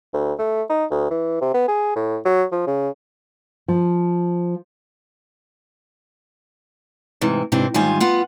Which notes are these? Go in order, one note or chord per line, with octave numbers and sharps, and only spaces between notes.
D2
A3
D#4
D2
E3
C3
B3
G#4
A2
F#3
F3
C#3
F3
G#2 C3 E3
G#2 C3 E3 C4 D4
D2 G#2 D#3 G3 F4 G#5
B3 F4 F#5